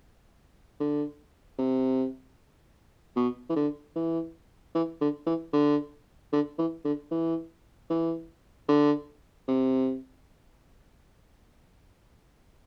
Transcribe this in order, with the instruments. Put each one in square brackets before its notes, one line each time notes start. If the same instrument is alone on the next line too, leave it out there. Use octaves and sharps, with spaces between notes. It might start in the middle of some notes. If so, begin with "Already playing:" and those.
[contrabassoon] D3
C3
B2
E3
D3
E3
E3
D3
E3
D3
D3
E3
D3
E3
E3
D3
C3